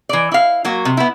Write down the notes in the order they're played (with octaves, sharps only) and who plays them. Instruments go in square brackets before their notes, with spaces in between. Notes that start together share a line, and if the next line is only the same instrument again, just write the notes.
[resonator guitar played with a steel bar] E3 D5
E4 F5
F#3 A#3 F#4
C3
B3 E4